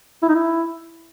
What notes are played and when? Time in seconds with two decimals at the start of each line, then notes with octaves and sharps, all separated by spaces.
0.23 E4
0.29 D#4
0.35 E4